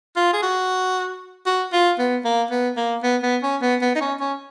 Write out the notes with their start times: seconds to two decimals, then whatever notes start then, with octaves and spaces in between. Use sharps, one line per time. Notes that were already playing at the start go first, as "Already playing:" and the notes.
0.16 F4
0.33 G#4
0.42 F#4
1.46 F#4
1.73 F4
1.98 B3
2.25 A#3
2.51 B3
2.77 A#3
3.03 B3
3.23 B3
3.43 C#4
3.62 B3
3.82 B3
3.95 D#4
4.01 C#4
4.20 C#4